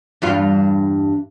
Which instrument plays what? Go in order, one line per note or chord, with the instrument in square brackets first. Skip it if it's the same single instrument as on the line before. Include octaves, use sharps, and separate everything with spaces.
[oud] E2 G2 F4